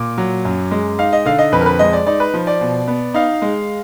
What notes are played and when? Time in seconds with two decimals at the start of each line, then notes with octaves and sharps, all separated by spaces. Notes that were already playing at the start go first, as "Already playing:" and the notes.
Already playing: A#2 D6
0.18 F#3
0.45 F#2
0.71 G#3
0.99 D#4 F5
1.13 D#5
1.26 D3 F5
1.39 D#5
1.52 F2 B4
1.61 A#4
1.66 B4
1.79 G#3 D#5
1.93 D5
2.06 D#4 D5
2.20 B4
2.34 F3
2.47 D5
2.61 B2
2.88 B3
3.14 D#4 F5
3.42 G#3